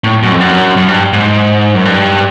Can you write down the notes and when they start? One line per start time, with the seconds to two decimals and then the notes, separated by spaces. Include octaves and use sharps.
0.04 A2
0.23 F#2
0.31 F2
0.40 F#2
0.77 F#2
0.88 G2
1.13 G#2
1.75 F#2
1.85 G2